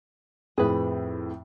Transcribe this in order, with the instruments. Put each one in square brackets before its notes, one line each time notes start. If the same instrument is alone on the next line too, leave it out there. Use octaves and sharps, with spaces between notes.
[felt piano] F2 A2 [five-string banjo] G#4 B4